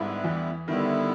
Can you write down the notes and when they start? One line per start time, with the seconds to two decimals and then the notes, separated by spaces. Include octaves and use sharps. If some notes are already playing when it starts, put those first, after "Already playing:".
Already playing: G#2 D3 G3 G#3 B3 E4
0.24 E2 E3
0.68 D3 D#3 G3 B3 E4